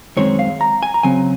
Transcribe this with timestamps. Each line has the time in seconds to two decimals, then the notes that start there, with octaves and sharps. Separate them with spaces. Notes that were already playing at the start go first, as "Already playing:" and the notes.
0.17 F#2 D#3 G#3 C4 C#5
0.39 F5
0.61 A#5
0.83 G#5
0.94 A#5
1.03 C#3 F#3 C4 G#5